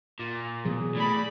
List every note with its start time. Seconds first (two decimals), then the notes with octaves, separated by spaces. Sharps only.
0.20 A#2
0.65 B2 E3 F#3 G#4
0.96 A2 D5 B5